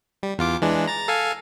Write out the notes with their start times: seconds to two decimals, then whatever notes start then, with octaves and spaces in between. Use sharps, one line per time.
0.23 G3
0.38 E2 F4 D6
0.62 E3 G#3 D4
0.87 A#5 A6
1.08 A4 F5 G#5